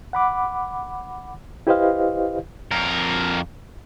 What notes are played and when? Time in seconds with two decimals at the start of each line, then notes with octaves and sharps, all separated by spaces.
0.13 F#5 B5 D6
1.67 E4 G4 B4 C5 D#5 F5
2.71 F2 A#4